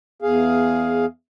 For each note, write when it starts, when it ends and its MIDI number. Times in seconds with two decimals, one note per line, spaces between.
0.22 1.06 40
0.22 1.06 68
0.22 1.06 77